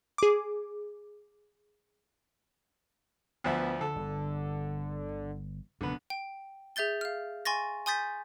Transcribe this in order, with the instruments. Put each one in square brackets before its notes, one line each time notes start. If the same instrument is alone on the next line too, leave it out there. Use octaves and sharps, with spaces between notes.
[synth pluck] G#4 D6
[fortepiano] D2 F3 E5 [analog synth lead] B3
[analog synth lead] D3 [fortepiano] A4
[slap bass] G1
[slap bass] F1 D#2 [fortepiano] D3 B3
[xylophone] G5
G#4 E5 G6 A6 G7
F5 F6
G#5 C6 C#6 A6 A#6
G#5 C6 D#6 G6 A6 B6